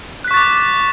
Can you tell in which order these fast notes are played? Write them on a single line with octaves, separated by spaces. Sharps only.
F#6 B6 C#6 A6 D6